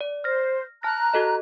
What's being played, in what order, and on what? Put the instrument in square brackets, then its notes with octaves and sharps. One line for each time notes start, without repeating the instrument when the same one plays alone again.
[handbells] D5
[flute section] C5 [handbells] F6 A#6
[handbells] A5 F6 A#6 [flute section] A#5 F#6
[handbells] F#4 A4 D#5